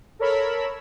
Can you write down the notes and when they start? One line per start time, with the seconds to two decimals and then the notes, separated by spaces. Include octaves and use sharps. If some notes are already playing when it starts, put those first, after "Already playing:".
0.19 A4 A#4 C#5 B5 E6